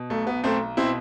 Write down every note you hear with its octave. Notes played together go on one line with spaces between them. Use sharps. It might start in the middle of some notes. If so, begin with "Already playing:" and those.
Already playing: B2
B1 A3
B3
B1 A3 C4
B2 C4 E4